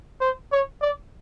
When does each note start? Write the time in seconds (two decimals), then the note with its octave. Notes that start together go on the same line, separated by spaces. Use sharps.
0.21 C5
0.52 C#5
0.82 D5